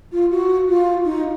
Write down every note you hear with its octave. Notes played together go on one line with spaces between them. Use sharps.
F4
F#4
F4
D#4